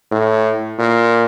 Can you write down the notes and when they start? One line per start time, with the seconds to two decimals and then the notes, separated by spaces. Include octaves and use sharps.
0.11 A2
0.79 A#2